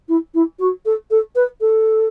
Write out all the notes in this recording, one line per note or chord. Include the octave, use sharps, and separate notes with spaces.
E4
E4
F#4
A4
A4
B4
A4